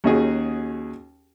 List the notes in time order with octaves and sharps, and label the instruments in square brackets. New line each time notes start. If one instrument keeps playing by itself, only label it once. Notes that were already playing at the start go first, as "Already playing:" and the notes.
[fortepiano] D#2 C#4 D#4 F#4 G#4